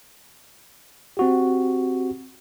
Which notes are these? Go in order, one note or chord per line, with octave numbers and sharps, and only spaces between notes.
C4 F#4 G4